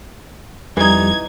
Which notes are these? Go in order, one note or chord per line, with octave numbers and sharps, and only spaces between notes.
F2 E3 G3 D#4 G#6